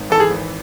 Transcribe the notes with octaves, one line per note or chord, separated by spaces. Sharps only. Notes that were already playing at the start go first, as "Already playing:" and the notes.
Already playing: G#1
E3 A4
G#4
G#1